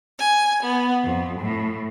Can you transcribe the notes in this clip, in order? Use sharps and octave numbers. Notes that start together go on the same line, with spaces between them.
G#5
B3
F2
A2